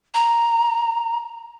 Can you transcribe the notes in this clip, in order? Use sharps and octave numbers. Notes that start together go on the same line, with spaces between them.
A#5